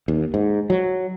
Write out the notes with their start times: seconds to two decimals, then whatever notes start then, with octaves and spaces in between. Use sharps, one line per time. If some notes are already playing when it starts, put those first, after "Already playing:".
0.08 D#2
0.34 G#2
0.70 F#3